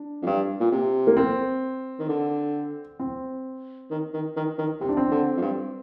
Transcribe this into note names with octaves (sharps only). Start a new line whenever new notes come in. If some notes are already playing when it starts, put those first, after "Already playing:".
Already playing: D4
F2
G2
A#2
C3
A#3
C4
D#3
D3
C4
D#3
D#3
D#3
D#3
C3 C4
D4
C4
D3
F2
G2